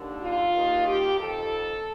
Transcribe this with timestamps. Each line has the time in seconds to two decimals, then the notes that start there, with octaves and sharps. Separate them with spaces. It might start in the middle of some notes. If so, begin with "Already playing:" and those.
Already playing: D#2 D3
0.20 F4
0.53 D#2 D#3
0.87 G4
1.20 F2 D#3 A4